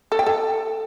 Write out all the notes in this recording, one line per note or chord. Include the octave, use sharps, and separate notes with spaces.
A4
G5
A4